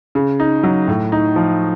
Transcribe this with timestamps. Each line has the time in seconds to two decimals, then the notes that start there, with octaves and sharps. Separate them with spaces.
0.15 C#3
0.40 D#4
0.63 F#3
0.88 A2
1.12 D#4
1.36 F3